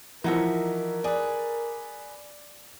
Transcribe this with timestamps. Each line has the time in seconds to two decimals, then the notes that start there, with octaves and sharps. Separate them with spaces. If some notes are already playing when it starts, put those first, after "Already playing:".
0.24 E3 F3 D#4 F#4 A#4 E5
1.04 G#4 B4 D5